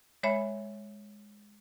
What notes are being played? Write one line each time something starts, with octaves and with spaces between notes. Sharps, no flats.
G#3 C#5 E5 B5